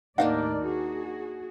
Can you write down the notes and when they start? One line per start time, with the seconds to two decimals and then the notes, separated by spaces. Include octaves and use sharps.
0.18 D#2 A2 A#3 D4 D#4 D5 F5 F#5
0.65 F#4 G#4